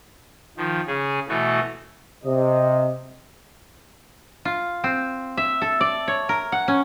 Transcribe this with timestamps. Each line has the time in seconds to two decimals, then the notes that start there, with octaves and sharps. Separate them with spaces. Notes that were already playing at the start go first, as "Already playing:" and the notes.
0.57 D#3 F3
0.87 C#3 G#4
1.29 B2 E3 A3 F#4
2.24 C3 D#5
4.45 F4
4.84 C4
5.37 E5
5.62 A4
5.81 D5
6.08 C#5
6.29 A#4
6.52 F#5
6.68 C#4